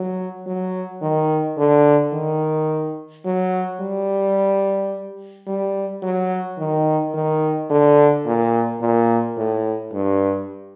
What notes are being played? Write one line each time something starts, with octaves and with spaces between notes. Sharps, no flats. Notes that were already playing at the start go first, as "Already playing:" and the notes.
Already playing: F#3
F#3
D#3
D3
D#3
F#3
G3
G3
F#3
D#3
D#3
D3
A#2
A#2
A2
G2